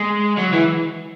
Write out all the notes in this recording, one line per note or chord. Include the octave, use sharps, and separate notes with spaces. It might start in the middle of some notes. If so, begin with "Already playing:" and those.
Already playing: G#3
F#3
E3